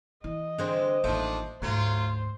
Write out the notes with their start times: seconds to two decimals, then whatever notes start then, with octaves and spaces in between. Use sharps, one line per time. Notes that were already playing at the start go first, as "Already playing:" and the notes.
0.24 E3 D#5
0.58 D3 G#3 C4
1.04 A1 D#2 F3 A3 D4 E5
1.62 D2 G#2 F#3 A3 F4 C5